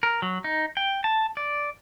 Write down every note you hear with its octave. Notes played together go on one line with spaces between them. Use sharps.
A#4
F#3
D#4
G5
A5
D5